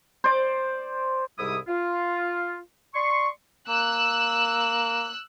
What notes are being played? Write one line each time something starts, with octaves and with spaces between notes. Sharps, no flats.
C5 D5
C2 G#2 C3 G3 E4 D#6
F4
D5 C6 C#6
A#3 E6 F#6